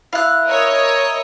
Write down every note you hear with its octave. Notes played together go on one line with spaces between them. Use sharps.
E4 E5 F5 F#6
A#4 C#5 D#5